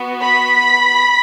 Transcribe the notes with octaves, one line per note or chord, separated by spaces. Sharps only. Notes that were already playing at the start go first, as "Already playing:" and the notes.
Already playing: B3 F#4
B5 B6